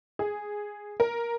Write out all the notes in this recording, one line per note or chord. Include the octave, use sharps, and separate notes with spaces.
G#4
A#4